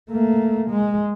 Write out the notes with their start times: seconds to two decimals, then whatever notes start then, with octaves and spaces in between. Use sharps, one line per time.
0.11 A3 A#3
0.70 G#3